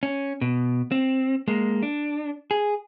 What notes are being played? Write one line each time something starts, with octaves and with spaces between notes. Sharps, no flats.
C#4
B2
C4
G#3 A#3
D4
G#4